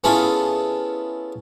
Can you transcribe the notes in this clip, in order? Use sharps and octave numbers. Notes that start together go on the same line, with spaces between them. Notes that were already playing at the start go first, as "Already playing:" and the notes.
B3 C#4 E4 F4 G#4 A4